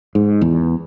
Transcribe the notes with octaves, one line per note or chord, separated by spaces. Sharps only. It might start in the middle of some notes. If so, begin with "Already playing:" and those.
G#2
E2